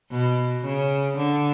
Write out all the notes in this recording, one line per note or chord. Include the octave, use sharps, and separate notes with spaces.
B2
C#3
D3